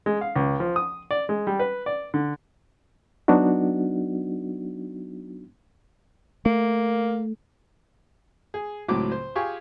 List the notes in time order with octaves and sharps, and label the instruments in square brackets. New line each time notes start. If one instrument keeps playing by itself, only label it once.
[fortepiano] G#3
F5
C#2
F3
D#6
D5
G#3
G3
B4
D5
D3
[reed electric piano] F#3 B3 D4 D#4 F#4
[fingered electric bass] A3 [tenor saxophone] A#3
[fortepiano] G#4
C#2 A2 F#3 C4 D6
C5
F4 G4 G#4 G#5 C#6